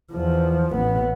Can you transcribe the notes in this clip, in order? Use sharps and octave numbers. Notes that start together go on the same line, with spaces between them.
E2 F3
A1 B3